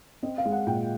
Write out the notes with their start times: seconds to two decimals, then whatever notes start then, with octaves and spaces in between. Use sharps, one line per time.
0.23 C4 D#5
0.38 F5
0.46 G#3
0.52 F#5
0.67 A#2 G5